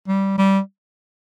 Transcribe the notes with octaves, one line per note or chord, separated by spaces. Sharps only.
G3
G3